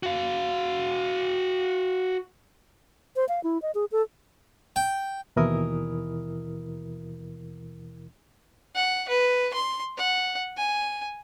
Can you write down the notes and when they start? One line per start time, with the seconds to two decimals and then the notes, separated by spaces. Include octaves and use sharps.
0.03 F#4 F5
3.16 C5
3.29 F5
3.44 E4
3.62 D#5
3.75 G#4
3.92 A4
4.76 G5
5.36 D#2 B2 E3 E4 A#4 D#6
8.75 F#5
9.09 B4
9.53 C6
9.97 F#5
10.57 G#5